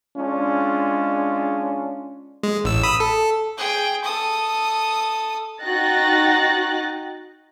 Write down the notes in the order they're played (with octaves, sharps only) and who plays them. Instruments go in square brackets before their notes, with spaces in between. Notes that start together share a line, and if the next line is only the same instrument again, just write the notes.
[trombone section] G#3 C#4 D4 F4
[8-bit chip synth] G#3
A1 E6
B5 D#6 E6
A4
[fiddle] G#4 G5
A4 D#6
[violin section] D#4 F#4 G5 F#6 A6 A#6